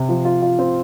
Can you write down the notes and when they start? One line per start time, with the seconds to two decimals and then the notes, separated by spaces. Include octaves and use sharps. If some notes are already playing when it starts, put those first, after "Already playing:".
Already playing: C3
0.09 F3
0.25 F4
0.42 F4
0.59 C4